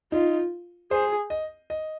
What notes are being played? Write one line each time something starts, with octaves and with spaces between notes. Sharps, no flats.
D#4 F4
G#4 C5
D#5
D#5